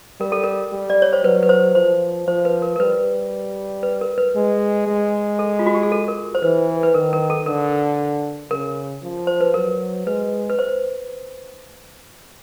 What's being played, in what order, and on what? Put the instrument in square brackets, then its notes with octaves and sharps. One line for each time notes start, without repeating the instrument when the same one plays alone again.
[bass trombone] G3 [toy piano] A#4
[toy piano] A4
A#4
[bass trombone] G3
[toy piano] D5
C#5
C5
[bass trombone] F#3 [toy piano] B4
[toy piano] B4
C5
[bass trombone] F3 [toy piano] C5
[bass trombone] F3 [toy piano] C5
[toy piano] B4
A#4
A#4
[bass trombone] G3 [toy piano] B4
[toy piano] B4
A#4
B4
[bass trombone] G#3
G#3
[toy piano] A4
F4
F#4
G4
G#4
A4
A#4
C5
[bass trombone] E3 [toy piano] B4
[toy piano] B4
[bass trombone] D#3 [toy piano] A#4
[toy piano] A#4
A4
[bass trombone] D3 [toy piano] A#4
[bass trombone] C#3 [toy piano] A#4
[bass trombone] F3
[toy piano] C5
B4
[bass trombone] F#3 [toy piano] A#4
[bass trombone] G#3 [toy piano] B4
[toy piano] B4
C5